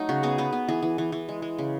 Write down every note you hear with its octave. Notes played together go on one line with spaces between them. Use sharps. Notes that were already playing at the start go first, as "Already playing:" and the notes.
Already playing: F#3 A3 D#4
C#3 F#4
B3 G#4
B3 B4
B3
E3 G#4
E3
E3
E3
G#3
G#3
C#3